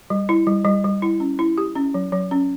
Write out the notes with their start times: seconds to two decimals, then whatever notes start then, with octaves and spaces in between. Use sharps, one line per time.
0.10 G3
0.29 E4
0.47 G3
0.65 G3
0.84 G3
1.02 E4
1.20 C#4
1.39 E4
1.58 G4
1.75 C#4
1.94 F#3
2.12 F#3
2.31 C#4